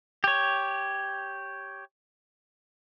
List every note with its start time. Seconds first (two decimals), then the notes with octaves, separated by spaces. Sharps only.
0.24 G4 C#5